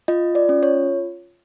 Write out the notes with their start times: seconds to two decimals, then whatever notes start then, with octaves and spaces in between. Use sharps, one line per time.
0.08 F4 D#5
0.35 D5
0.49 C#4
0.63 C#5